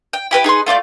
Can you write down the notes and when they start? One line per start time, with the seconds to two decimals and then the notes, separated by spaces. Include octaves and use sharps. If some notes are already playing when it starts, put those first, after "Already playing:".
0.13 G5
0.31 E4 G4 B4 G5
0.44 D#4 G#4 B4 C6
0.66 A3 F4 D5 G6